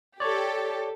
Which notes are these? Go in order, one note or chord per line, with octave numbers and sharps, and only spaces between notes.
G4 A4 C#5 D5